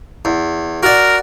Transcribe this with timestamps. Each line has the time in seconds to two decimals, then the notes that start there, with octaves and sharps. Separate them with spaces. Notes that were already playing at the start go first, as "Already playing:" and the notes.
0.25 E2
0.83 F#4 A#4 D5